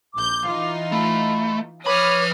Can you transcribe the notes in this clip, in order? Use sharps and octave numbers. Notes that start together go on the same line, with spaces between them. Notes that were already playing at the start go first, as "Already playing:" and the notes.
A#1 D6 G6
E3 D#4 F4
A3 B5
F3 B4 C#5 B5 D6 D#6 F6